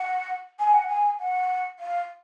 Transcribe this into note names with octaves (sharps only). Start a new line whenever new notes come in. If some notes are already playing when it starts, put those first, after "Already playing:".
Already playing: F#5
G#5
F#5
G#5
F#5
F5